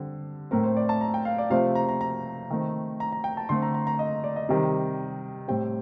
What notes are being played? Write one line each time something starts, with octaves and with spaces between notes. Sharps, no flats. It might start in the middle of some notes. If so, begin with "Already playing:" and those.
Already playing: D3 G3 C4
A2 A3 C4 A#4
C5
D5
A5
A#5
G5
F5
D5
C3 F3 A3 C4 F5
A#5
A#5
A#5
D#3 A3 C4
A#5
A#5
G5
A5
D3 A3 C4 C6
A#5
A#5
A#5
D#5
D5
D#5
C3 D#3 G3
A2 G3 C4 G5